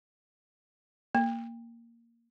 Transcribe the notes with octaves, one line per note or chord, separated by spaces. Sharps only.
A#3